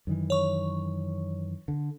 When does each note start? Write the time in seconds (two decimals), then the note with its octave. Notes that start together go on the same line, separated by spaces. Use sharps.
0.07 F#2 D#3 E3
0.30 C#5 C#6
1.68 D3